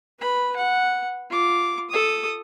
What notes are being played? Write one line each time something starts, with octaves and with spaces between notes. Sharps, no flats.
B4 B5
F#5
F4 D6
A4 D#6